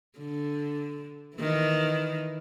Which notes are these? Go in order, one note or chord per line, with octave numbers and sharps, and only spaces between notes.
D3
D#3 E3